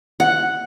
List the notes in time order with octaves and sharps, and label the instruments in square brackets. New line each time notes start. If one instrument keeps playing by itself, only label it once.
[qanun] F#5